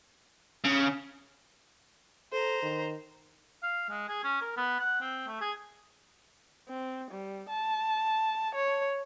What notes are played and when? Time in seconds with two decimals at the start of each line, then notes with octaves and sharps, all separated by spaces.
0.64 C#3
2.33 A4 C5 A#5
2.63 D#3
3.63 F5
3.89 G#3
4.08 G#4
4.23 C#4
4.41 A#4
4.57 B3
4.79 F#5
5.01 C4
5.27 A3
5.41 G#4
6.69 C4
7.11 G3
7.49 A5
8.55 C#5